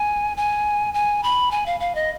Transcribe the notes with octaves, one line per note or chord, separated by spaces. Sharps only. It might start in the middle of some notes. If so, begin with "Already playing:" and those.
Already playing: G#5
G#5
G#5
B5
G#5
F5
F5
D#5